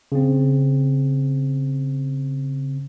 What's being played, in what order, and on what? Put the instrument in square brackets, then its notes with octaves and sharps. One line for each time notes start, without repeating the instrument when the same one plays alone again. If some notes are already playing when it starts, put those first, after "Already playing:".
[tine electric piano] C#3 C4